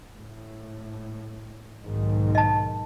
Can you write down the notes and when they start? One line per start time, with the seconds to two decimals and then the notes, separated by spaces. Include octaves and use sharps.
0.16 A2
1.82 B1 G#2 D#3
2.35 D#5 A5